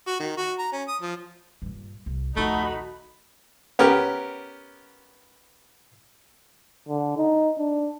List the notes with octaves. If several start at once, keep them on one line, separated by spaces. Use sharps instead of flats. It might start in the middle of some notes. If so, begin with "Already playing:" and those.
F#4
D#3
F#4
A#5
C#4
D#6
F3
G2 A#2
C2
A#1 D#2 A3 D#4 F#4 B5
B3 C#4 G4 A#4
D3
D#4
D4